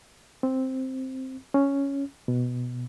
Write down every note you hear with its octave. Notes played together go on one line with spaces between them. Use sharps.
C4
C#4
B2